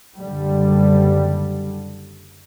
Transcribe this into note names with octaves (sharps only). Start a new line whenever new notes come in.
F#1 D3 G3